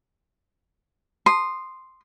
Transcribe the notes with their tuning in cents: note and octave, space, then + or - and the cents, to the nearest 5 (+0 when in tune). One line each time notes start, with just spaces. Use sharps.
C6 +0 D#6 -15